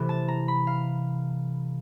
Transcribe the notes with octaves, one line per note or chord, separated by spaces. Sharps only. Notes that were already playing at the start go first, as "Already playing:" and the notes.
Already playing: C3 E3 A3
A5
A#5
B5
F5